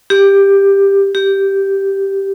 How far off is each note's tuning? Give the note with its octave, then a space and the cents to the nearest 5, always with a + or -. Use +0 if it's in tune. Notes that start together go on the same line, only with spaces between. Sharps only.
G4 +10
G4 -5